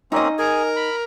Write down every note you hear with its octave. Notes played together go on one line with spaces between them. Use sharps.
A#3 C4 C#4 D#4 D#5
G#4 A#4 G#5
B5